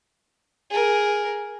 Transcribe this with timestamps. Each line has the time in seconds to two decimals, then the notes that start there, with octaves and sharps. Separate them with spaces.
0.71 G#4 A#4